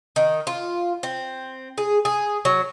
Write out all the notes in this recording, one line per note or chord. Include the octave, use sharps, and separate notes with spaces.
D#3
F4
C4
G#4
G#4
F#3